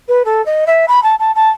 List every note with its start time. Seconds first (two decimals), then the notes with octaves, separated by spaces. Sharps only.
0.08 B4
0.24 A4
0.45 D#5
0.66 E5
0.88 B5
1.03 A5
1.19 A5
1.35 A5